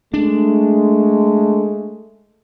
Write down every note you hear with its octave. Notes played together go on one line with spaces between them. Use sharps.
G#3 A3 D4